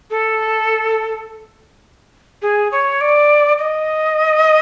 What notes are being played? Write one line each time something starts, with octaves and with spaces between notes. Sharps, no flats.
A4
G#4
C#5
D5
D#5